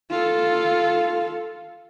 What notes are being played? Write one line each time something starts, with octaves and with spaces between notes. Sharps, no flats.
F4 A4